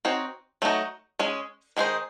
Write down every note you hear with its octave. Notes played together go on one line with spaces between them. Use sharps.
C4 D#4 F#4 C#5
F#3 A3 D#4 F#4
G#3 C#4 G#4
D#3 G#3 D#4 G#4 C5